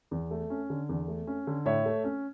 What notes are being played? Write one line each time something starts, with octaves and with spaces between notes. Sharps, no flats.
E2
A3
C#4
D3
E2
A3
C#4
D3
A2 C#5 E5
A3
C#4